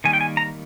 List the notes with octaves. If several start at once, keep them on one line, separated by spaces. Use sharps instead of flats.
D#3 G3 A#3 G#5
G5
G#5
A#5